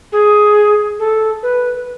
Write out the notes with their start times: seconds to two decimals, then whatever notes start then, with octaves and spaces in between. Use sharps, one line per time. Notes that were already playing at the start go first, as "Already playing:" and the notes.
0.12 G#4
0.99 A4
1.42 B4